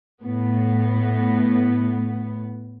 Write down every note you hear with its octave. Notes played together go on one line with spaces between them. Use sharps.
A2 B3